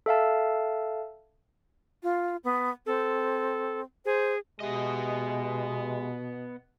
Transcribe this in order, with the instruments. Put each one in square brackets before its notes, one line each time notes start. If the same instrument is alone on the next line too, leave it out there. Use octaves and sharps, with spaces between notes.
[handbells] A4 E5 F5 A5
[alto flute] F4
B3
[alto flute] C4 [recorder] A4
[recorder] G#4 [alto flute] C5
[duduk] B2 [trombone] G#3 [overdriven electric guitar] B3 D#5 [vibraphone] G4 E5